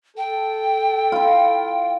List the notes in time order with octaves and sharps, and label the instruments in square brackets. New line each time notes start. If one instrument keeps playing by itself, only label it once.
[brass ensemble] A4 [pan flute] G5
[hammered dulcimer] E4 F4